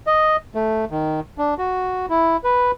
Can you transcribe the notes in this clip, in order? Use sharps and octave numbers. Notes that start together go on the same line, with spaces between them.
D#5
A3
D#3
D4
F#4
E4
B4